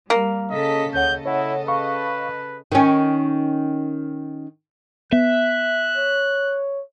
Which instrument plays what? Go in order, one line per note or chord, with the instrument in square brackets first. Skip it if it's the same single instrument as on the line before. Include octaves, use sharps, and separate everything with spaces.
[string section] G3 [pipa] A#3
[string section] C#3 A4 B6 [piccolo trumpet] D#5
[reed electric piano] D2 C#5 F#5 [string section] C#3 A4 D#5 [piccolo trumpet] G6
[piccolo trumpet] E4 [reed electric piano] C#5 F#5
[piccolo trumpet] B4 [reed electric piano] F5 B5 C#6
[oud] D#3 C#4
[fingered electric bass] B3 [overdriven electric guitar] E5 [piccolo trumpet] F#6
[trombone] C#5